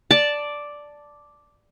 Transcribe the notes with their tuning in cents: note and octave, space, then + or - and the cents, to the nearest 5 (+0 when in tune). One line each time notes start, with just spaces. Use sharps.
D5 +0 A5 +0